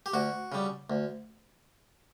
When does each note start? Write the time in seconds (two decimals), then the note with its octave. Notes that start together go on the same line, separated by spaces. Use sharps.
0.06 G4
0.14 D2 F#4
0.52 C#3 G3
0.90 D2